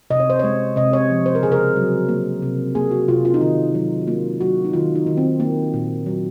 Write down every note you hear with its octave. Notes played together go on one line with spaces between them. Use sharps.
C3 D#5
C#5
C5
G#3 C#5
C3 D#5
C#5
F3
C5
A#4
C#3 G#4
A#4
F#3
A#3
C3
A#3 G#4
F#4
C3 F4
F4
D#4
D#3 F4
F#3 D#4
A#3 F4
F#3 F#4
D#4
D#3 F4
D#4
D#3
C4
A#3
A#2
F#3